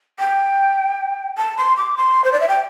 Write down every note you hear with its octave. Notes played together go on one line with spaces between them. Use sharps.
G5
A5
C6
D6
C6
C5
D5
E5
G5